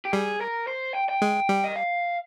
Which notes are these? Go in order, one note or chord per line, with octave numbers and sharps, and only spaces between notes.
G4
G3 G#4
A#4
C5
G5
G5
G#3
G3
D#5
F5